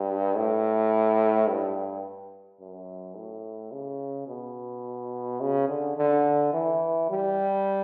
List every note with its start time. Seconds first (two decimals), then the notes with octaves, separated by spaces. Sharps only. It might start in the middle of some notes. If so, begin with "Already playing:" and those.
Already playing: G2
0.36 A2
1.48 G2
2.60 F#2
3.16 A2
3.72 C#3
4.28 B2
5.41 C#3
5.69 D3
5.97 D3
6.53 E3
7.10 G3